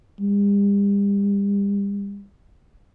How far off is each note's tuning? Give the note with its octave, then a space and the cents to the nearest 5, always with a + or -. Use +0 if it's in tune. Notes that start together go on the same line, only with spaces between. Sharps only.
G3 +40